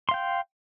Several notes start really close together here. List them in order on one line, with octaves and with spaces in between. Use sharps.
C6 F5 G5